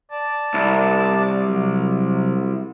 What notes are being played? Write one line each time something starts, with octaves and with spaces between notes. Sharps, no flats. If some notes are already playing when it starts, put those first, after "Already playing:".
D5 A5
C2
C3 F#3